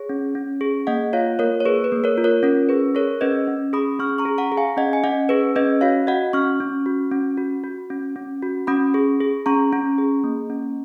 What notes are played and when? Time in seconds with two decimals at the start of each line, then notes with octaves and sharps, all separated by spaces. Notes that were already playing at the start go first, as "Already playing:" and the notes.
Already playing: G#4 C#5
0.09 C#4
0.35 C#4
0.61 G#4
0.87 A#3 D#5 F#5
1.13 F4 C#5 F5
1.39 A#3 A#4 C#5
1.60 C#5
1.65 G#4 B4
1.84 B4
1.92 A#3
2.04 A#4 C#5
2.17 F4
2.24 A#4 C#5
2.43 C#4 A#4
2.69 G#4 B4
2.95 G#4 A#4 C#5
3.21 C#4 B4 D#5
3.47 C#4
3.73 G#4 B5 D#6
3.99 C#4 C#6 F6
4.18 A#5 C#6
4.25 G#4
4.38 F#5 A#5
4.52 G#4
4.57 F5 G#5
4.77 C#4 D#5 F#5
4.93 G#5
5.03 C#4 D#5 F#5
5.29 G#4 B4
5.56 C#4 B4 D#5
5.81 F#4 C#5 F5
6.07 F#4 D#5 F#5
6.33 C#4 C#6 F6
6.60 C#4
6.86 F#4
7.11 C#4
7.37 F#4
7.64 F#4
7.90 C#4
8.16 C#4
8.42 F#4
8.67 C#4 B5 D#6
8.94 G#4
9.21 G#4
9.46 C#4 A#5 C#6
9.73 C#4
9.98 G#4
10.24 A#3
10.50 C#4